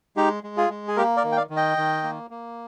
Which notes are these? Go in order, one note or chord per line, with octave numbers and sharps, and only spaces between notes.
G#3 D#4 G4
G#3
F4 G#4
G#3
G#4
A#3 G4 A#4
A#4 D5
D#3
G5
D5 F5
D#3
D#5 G5
D#3
A#3
A#3